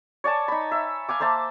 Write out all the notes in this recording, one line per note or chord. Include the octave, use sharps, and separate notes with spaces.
C#5 D5 G#5 A5
D#4 B5
E5
F5 G#5 D6
A#3 C5 E5 A5